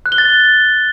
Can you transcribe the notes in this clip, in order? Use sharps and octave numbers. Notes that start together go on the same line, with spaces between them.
F#6
G7
A6